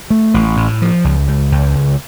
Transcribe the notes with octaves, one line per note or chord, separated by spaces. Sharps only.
A3
A1
A2
F3
C#2
C#2
C#2
C#2